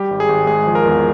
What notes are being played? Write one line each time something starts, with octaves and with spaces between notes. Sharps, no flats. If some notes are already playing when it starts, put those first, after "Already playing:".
Already playing: G3 G4
G#1
G#4
G#1
G#3 G#4
F3
A#4
E2